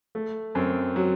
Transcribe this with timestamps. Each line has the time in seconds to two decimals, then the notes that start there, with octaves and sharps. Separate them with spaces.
0.15 A3
0.55 F#2 C4
0.96 F#3